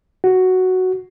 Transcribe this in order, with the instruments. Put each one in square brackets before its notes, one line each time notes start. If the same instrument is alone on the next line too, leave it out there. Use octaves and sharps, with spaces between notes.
[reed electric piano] F#4